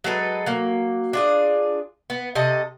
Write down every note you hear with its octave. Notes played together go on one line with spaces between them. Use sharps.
F#3 G#3 A4 B4
F#3 A#3
D4 F4 G#4
B3
C3 A4 D#5